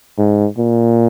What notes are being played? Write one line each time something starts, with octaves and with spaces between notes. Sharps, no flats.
G#2
A#2